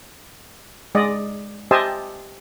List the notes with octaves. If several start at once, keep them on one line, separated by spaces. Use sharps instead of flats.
G#3 D5 D#5
G4 C5 D#5 E5 G#5 A5